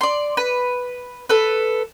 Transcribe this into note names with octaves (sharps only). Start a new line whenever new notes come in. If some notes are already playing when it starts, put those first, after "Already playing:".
D5 C6
B4
A4 B4